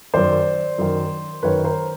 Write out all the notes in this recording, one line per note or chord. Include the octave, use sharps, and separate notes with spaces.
F#2 D#3 C5 D5
F#2 D#3
F#2 D#3 B4 C#5
A#4 C5